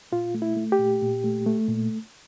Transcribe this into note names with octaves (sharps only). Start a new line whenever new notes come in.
A#2 F4
A3
E4
A3
G4
A#2
A#2
A3
A3
A#2